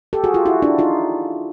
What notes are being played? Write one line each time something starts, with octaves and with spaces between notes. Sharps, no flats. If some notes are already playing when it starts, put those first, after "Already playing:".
G4 A4
F#4 G#4
F4 G4
E4 F#4
D4 E4
D#4 F4